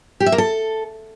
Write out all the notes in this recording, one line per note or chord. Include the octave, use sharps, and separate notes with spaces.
G4
E5
A#3
A4